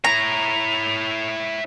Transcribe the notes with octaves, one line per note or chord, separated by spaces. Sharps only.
E4 C#5 A#5 F7